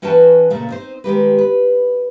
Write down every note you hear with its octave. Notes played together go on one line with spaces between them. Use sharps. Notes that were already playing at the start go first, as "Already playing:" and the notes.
E3 C#4 F#4 B4 G5 A5
A#2 C#3 A3
C4 D#4 C5
D#3 G#3 G4 B4
B4